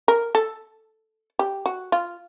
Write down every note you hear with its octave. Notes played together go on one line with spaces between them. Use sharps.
A#4
A4
G4
F#4
F4